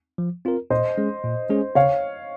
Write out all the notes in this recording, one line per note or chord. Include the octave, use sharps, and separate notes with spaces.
F3
C4 F4 A#4
A#2 C5 D#5
G#3 C#4 G#4
A#2
G#3 C#4 G#4
C#3 C#5 F5